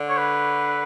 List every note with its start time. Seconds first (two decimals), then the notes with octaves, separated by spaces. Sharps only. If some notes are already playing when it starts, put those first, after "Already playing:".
Already playing: D3
0.09 C#5
0.17 B4